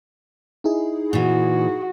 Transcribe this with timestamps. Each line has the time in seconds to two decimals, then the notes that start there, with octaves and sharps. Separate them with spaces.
0.64 D#4 E4 G#4
1.13 A#2 E3 F#4